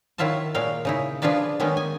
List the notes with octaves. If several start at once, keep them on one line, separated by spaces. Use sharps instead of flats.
D#3 F#3 E4 F4 E5 A5
A#2 F#3 G#3 F5 G5
C#3 D#4 E4
F3 D4 F4 G#4 B4 D5
D#3 F#3 G#3 B3 C#4 D#4
G#5